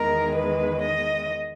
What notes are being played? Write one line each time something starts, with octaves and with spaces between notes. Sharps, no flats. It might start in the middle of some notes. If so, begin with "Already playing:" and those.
Already playing: E2 D#3 G#3 A#4
B4
D#5